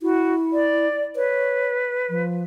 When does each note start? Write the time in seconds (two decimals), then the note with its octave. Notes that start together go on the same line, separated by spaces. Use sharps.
0.02 E4 F#4
0.53 D5
1.16 B4 C#5
2.09 F3